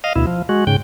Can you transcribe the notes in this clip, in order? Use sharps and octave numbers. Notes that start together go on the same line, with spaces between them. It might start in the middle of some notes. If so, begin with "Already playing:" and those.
D#5 F5
D2 B2 E4
F3
G#3 F#4
G#2 C#3 G5